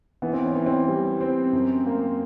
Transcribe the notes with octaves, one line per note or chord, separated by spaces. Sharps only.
E3 B3
C4
C#4
E3
C4
G3
C4
F#2
A#3